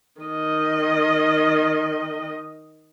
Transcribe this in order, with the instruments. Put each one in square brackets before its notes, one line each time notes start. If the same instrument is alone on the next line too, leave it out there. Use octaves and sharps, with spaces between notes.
[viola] D#3 D#5